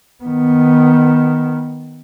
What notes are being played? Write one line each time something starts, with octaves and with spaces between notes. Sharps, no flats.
D#3 B3